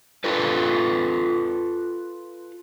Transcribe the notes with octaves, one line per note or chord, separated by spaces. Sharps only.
F4 A4 B4